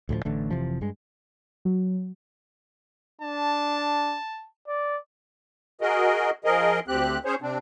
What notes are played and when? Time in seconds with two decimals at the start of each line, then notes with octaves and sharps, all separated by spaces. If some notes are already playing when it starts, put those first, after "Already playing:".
0.09 D2 A2 E3 F3
0.25 A1 D3 A3
0.50 F1 C3 E3 F3
0.81 G2 G#3
1.65 F#3
3.21 D4 A5
4.68 D5
5.81 F#4 G#4 A#4 D#5
6.45 F3 G#4 A#4 D#5
6.88 D2 C4 G4 F#6
7.25 C#4 G#4 C5 C#5
7.42 C3 C4 D4